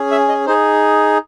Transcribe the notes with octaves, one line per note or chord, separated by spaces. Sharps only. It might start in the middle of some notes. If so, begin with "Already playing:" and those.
Already playing: C#4 G#4
E5
D#5
D#4 G#4 C5